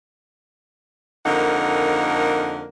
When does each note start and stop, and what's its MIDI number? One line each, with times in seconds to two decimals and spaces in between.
1.26 2.68 41
1.26 2.68 50
1.26 2.68 58
1.26 2.68 63
1.26 2.68 70
1.26 2.68 78